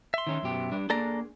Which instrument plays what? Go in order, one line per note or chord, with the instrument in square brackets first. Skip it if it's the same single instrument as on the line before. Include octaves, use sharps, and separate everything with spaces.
[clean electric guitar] E5 C6
[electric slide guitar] D#3 C#4 D#4
F#2 B2 G4
G3 D4
[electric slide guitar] A#3 D4 G#4 [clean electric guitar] A4 D5 A#5